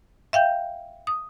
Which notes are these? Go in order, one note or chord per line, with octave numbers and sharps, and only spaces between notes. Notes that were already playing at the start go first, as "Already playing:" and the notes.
E5 F5 G5 G6
D#6